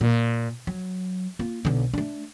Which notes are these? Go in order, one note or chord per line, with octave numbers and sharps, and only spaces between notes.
A#2
F#3
A#3 F4
B1 D3
A3 D4